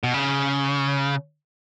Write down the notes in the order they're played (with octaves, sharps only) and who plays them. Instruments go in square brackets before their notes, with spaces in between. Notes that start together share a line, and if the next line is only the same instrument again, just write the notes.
[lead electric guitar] B2
C#3